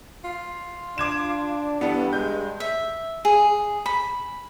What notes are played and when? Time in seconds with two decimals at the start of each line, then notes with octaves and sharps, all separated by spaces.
0.24 F4
0.98 D4 D6 G#6 E7
1.81 G2 E3 B3 D4 A4
2.13 G#3 G6
2.60 E5
3.25 G#4
3.86 B5